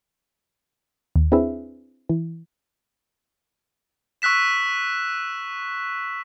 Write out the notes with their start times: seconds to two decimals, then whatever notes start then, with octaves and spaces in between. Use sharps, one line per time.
1.16 D#2
1.32 C4 D4 E4 G#4 B4 E5
2.09 E3
4.22 C#6 E6 F#6 B6 E7